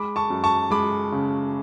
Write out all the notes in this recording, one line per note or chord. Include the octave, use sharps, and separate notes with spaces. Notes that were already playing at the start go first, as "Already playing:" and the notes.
Already playing: G#3 B5 D6
A5 C#6
F#2
A5 C#6
G#3 B5 D6
C#3